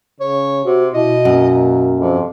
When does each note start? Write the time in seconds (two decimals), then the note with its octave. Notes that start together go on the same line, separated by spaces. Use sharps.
0.21 C#3 C#5
0.65 C3 F#4
0.94 B2 E4 D#5
1.25 F#2 A#3
1.98 F2 C3